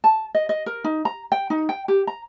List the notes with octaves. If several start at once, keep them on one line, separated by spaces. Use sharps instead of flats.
A5
D#5
D#5
A#4
D#4
A#5
G5
D#4
G5
G4
A#5